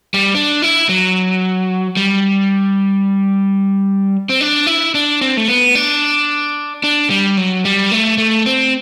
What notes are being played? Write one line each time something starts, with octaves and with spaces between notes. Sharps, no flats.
G3
D4
E4
F#3
G3
C4
D4
E4
D4
C4
A3
B3
D4
D4
G3
F#3
G3
A3
A3
C4